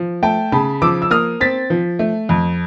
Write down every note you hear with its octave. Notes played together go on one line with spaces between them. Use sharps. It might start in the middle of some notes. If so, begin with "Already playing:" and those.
Already playing: F3
A3 G5 A5
C#3 A5 B5
F3 D6 E6
E6
A#3 D#6 F6
C4 A6 B6
F3
A3
F2